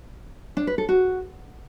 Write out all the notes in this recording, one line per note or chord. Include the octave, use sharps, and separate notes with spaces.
D4
B4
A4
F#4